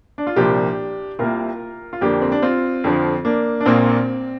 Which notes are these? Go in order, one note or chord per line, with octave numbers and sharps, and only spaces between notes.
D4
F4
C2 A#2 F3 A#3 D4 G4
C2 C3 A#3 F4 A#4
F4
F2 D3 A#3 D4 G4
C4
D4
C4 F4
F2 D3 F3
A#3 D4
D4
A#1 A#2 A#3 C4